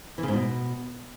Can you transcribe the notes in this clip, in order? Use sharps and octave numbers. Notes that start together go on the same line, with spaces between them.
E3
C#3
G#2
B2